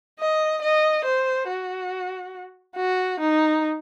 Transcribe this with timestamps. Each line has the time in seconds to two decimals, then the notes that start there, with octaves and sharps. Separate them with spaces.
0.20 D#5
0.62 D#5
1.04 C5
1.48 F#4
2.76 F#4
3.20 D#4